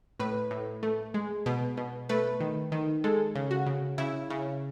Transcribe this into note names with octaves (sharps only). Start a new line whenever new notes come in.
A2 B4
A2
A3
G#3
B2
B2
A3 B4
D#3
D#3
G#3 A4
C#3
F#4
C#3
C#3 E4
C#3